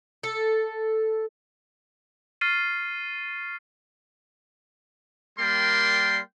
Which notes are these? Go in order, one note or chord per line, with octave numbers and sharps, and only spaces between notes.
A4
C#6 F6 A6 C7 D#7
G3 A#3 A#4 D5 G5 C6